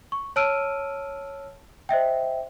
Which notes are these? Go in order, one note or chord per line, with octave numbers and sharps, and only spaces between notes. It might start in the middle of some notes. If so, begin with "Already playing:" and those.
C#6
C#5 A5 E6 F6 D7 D#7
C5 D#5 E5 G5